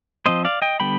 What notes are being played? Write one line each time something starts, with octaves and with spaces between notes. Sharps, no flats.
F3 C4 C5 D#5
D5 F5
D#5 G5
D3 G3 B3 G5 B5